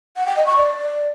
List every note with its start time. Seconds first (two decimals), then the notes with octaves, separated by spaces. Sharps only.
0.16 F#5
0.26 G5
0.36 D#5
0.46 C#6
0.56 D5